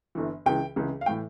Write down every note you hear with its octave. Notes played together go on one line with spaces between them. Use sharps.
G1 G2 E3
C#2 C#3 E3 G5
C#2 C#3 E3
F5
A2 E3 G5